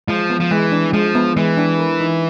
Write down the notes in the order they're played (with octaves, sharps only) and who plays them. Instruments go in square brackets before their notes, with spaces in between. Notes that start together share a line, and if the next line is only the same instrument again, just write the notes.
[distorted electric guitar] F3 [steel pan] G#3
[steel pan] B3
[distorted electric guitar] F3
[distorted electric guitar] E3 [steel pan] G#3
[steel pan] D4
[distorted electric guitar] F3 [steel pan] G#3
[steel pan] B3
[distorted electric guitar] E3 [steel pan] G#3
[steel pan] D4
A#4
D#4